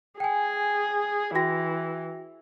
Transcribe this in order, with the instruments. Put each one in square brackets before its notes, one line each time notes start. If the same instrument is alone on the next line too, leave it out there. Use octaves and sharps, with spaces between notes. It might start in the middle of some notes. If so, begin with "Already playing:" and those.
[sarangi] G#4 [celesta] G5 G#5
[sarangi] E3 [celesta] F#4 G5 A#6